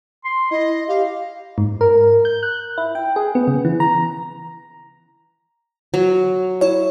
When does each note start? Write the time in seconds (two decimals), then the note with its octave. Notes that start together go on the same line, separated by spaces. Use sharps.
0.24 C6
0.51 E4 D#5
0.88 G4 F5
1.58 G#2
1.81 A#4
2.25 G6
2.43 F#6
2.78 E4
2.95 G5
3.16 G#4
3.35 B3
3.48 C#3
3.65 E3
3.80 A#5
5.94 F#3
6.61 E4 C#5